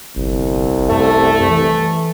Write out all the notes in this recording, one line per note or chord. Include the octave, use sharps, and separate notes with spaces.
G1 C2
F#2 A3
E3